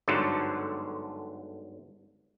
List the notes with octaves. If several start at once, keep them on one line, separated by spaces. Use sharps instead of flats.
G1 G#2 D3 F#3 A4 A5